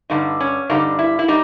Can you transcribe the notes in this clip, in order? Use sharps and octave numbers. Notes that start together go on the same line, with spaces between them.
G2 D3 G3 D#4
C#4
G2 D3 G3 D#4
E4
E4
G3 D#4